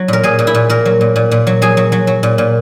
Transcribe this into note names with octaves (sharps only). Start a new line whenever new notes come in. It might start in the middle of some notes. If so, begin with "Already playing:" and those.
Already playing: F#3
A#2 A#4
A#2 G#4
A#2
E4
A#2
A#2 A#4
F#3
A#2
A#2
A#2
F#3
F#3 G#4
F#3
F#3
F#3
A#2
A#2